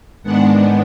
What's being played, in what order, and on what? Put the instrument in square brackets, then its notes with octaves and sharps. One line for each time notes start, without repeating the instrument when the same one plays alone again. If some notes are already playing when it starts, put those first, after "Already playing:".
[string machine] G#2 D#3 G#3 B3 D4 F#5